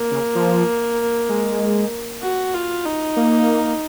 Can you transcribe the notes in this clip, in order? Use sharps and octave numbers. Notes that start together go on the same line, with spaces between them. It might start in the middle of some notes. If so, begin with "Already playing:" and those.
Already playing: A#3
C#3
F3
G#3
F#4
F4
D#4
A#3